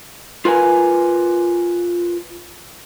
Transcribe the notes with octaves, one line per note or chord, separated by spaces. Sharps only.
F4 A#4 B4 G#5